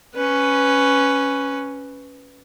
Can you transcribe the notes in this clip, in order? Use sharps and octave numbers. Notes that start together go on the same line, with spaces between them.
C#4 B4